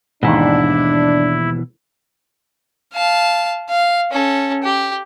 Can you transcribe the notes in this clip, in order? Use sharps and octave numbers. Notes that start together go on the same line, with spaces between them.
D#2 G#2 B2 E3 D4 E4
F5 A5
F5
C#4 A4
G4